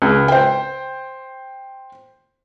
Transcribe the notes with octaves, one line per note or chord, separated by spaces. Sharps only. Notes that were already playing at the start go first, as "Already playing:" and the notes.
C#2
C5 G5